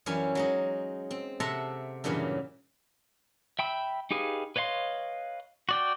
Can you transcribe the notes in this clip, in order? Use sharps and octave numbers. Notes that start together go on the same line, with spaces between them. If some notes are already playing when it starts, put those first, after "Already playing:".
F#2 E3 G3 C#4 G#5
F#3 G#3 D#4
C4
C3 A4 E5 F#5 A#5 C6
G2 A#2 C#3 E3 F#3
E5 G5 B5 E6
D#4 G4 G#4 B4 F5
B4 C#5 D#5 F5 C6
F#4 D5 G5